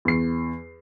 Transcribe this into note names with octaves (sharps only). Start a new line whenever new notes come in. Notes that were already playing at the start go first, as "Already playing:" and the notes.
E2 C7